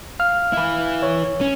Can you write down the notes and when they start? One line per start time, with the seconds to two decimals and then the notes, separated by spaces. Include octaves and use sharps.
0.20 F5 F6
0.53 E4 B4
1.03 C#5
1.41 C#4